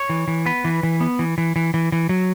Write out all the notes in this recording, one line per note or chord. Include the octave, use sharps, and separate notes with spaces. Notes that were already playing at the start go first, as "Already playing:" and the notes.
Already playing: C#5
E3
E3
B3 B4
E3
E3
B3
E3
E3
E3
E3
E3
F#3